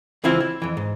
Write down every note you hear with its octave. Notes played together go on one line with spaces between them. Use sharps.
C#2 E3 C4 E4 F4 E5
E4
F2 E3
G#2